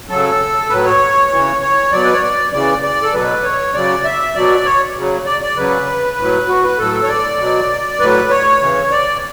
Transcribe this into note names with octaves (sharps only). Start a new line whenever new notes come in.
C#3 F#3 A4
A2 F#3 B4
C#5
C#3 E3
C#5
B2 F#3 D5
B4
C#5
D5
C#3 E3 D5
D5
A4
B2 F#3 B4
C#5
C#3 F#3 D5
E5
B2 F#3 D5
C#5
C#3 F#3
D5
D5
C#3 F#3 B4
A2 F#3
F#4
B4
A2 F#3 A4
C#5
D5
B2 F#3
A2 F#3 B4
C#5
C#3 E3
D5